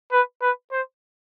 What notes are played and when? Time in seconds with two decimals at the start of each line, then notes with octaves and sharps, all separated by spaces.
0.12 B4
0.42 B4
0.72 C5